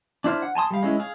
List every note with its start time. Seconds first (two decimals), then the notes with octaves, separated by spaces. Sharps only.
0.24 D4 E4 C5 F6
0.42 F#5
0.55 G#5 A5 C6 D#6
0.71 G3 F5
0.83 G#3 C#4 E4
1.00 G#4 F5